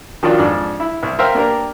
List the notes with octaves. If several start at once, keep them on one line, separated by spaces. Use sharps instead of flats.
D#3 F3 F#3 D4 F4
F2 G#2 D4
E4
C2
A#4 C5 E5 F5 G5
A#3 D4 G4 A#4